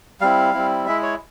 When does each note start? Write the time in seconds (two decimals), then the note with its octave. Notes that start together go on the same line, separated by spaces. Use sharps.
0.21 G3 C4 E4 F5
0.54 G3 C4 E4
0.87 G#3 E4 E5
1.02 C#5